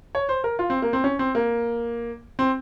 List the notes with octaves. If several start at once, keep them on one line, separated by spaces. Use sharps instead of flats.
C#5
C5
A#4
F4
C4
A#3
C4
C#4
C4
A#3
C4